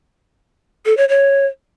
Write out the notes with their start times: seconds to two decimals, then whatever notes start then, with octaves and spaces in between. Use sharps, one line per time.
0.86 A4
0.97 C#5
1.09 C#5